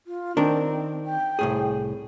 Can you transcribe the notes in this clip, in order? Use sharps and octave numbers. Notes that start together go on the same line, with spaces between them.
F4
D#3 C4 D4 A#4
G5
C2 A2 G#4